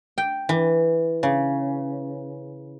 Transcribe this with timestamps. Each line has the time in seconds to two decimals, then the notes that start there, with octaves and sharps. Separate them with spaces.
0.18 G5
0.49 E3
1.23 C#3